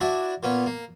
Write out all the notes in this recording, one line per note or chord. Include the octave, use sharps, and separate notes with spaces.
D4 E4 F#4
A#2 B3 C#4
A#3